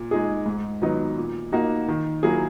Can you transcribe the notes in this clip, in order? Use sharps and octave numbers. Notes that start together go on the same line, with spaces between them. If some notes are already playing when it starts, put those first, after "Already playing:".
Already playing: A#2
G#3 D#4 G#4
G#2
D#3 F#3 B3 D#4
A#2
A#3 D#4 F#4
D#3
F#3 A#3 E4 G#4